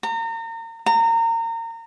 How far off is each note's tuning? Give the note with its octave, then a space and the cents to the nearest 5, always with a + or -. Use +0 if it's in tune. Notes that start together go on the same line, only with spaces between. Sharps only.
A#5 -35
A#5 -30